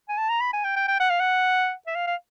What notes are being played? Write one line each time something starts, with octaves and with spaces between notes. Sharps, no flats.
G#5
A5
A#5
B5
G#5
G5
G5
G5
F#5
F5
F#5
E5
F5
F5